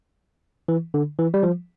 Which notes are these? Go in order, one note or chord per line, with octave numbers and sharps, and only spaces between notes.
E3
D3
E3
G3
F3